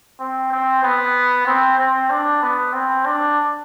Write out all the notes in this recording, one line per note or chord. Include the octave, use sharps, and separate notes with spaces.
C4
C4
B3
C4
C4
D4
B3
C4
D4